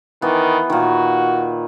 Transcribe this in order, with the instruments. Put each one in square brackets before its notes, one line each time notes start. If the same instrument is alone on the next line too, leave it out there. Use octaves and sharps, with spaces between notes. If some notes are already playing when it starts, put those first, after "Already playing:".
[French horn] D#3 [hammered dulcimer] E3 B3
[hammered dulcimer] A#2 D#3 [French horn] F#4